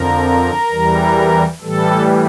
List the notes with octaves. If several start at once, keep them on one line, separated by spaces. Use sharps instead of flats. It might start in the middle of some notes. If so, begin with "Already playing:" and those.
Already playing: F2 D3 F3 A#4
E2 E3 G3
A2 E3 G3 A4